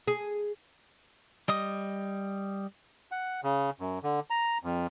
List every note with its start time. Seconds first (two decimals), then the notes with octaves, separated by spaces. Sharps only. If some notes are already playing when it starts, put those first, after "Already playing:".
0.08 G#4
1.48 G3 D#5 D#6
3.11 F#5
3.43 C#3
3.80 F#2
4.03 D3
4.30 A#5
4.63 F2